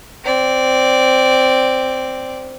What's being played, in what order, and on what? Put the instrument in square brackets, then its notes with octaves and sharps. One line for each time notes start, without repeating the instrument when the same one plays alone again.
[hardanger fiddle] C4 D5